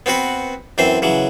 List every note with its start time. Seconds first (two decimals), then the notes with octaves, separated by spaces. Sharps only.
0.06 B3 C4 F#4 B4
0.78 F#2 E3 C4 C5
1.02 C#3 E3 F#3